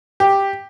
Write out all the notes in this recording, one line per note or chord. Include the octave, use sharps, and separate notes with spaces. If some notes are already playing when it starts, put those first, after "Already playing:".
G4